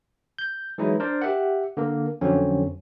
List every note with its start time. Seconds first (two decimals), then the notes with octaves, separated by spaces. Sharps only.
0.38 G6
0.78 E3 F#3 G#3 D#4 E4
1.00 D4 A#4 C5 D5
1.22 G4 E5 F#5
1.77 D3 A#3 A#4
2.21 F2 D3 F#3 C4 C#4